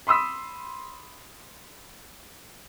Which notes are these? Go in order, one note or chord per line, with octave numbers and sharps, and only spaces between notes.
B5 C6 D#6 E6 B6